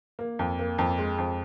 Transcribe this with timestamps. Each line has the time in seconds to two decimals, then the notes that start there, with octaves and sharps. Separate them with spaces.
0.19 A#3
0.39 F2
0.59 A#3
0.78 F2
0.98 G#3
1.18 F2